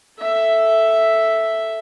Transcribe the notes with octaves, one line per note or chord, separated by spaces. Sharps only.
A4 E5